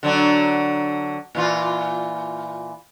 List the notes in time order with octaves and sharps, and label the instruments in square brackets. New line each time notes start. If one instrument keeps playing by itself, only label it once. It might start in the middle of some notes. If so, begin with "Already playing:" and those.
[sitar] D3 F#3 D4
A#2 E3 F4